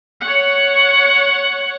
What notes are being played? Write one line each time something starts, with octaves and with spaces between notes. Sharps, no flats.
C#5 F#5